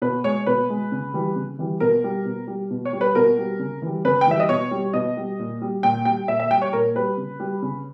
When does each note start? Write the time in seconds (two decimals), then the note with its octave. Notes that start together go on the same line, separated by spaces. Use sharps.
0.02 B2 B4
0.24 G#3 C#5
0.46 B2 B4
0.69 G#3
0.92 C#3
1.14 E3 G3
1.36 C#3
1.59 E3 G3
1.80 B2 A#4
2.04 G3
2.25 B2
2.48 G3
2.70 B2
2.85 C#5
2.93 G3
3.01 B4
3.15 B2 A#4
3.38 G3
3.59 C#3
3.82 E3 G3
4.05 C#3 B4
4.21 G5
4.27 E3 G3 E5
4.40 D#5
4.49 B2 C#5
4.71 G3
4.93 B2 D#5
5.17 G3
5.39 A#2
5.62 G3
5.83 A#2 G5
6.05 G3 G5
6.28 A#2 E5
6.40 E5
6.51 G3 G5
6.62 C#5
6.73 A#2 A#4
6.95 G3 B4
7.17 C#3
7.40 G3
7.62 C#3